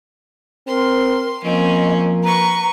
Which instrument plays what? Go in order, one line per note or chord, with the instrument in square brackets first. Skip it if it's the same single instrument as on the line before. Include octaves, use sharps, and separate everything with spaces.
[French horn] C4 [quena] A#4 [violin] C6
[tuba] F3 [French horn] A#3 [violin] C4 C#4 [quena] D#5
[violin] B4 C#6 [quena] A#5